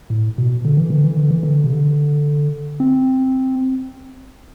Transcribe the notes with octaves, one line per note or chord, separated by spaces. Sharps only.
A2
B2
D3
E3
D3
E3
D3
E3
D3
C3
D3
C4